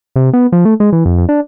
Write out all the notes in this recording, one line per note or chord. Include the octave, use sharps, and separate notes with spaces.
C3
B3
F3
A3
G#3
E3
F2
F2
D4